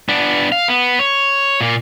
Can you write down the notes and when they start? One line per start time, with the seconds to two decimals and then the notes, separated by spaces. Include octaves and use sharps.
0.09 B3 D4
0.52 F5
0.68 B3
0.99 C#5
1.61 A#2 A#3